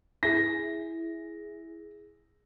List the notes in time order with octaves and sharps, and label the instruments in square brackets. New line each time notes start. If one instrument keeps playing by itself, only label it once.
[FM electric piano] E4 G#4 [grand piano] A#6